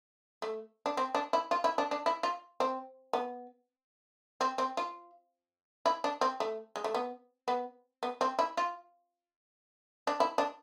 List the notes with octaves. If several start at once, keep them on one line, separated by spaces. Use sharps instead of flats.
A3
D4
C4
D4
E4
F4
E4
D4
D4
E4
F4
C4
B3
C4
C4
F4
E4
D4
C4
A3
G#3
A3
B3
B3
B3
C4
E4
F4
D4
E4
D4